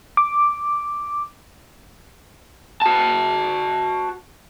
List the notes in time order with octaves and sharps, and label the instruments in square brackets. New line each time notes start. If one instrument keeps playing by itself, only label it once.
[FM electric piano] D6
[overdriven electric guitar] F#4 A5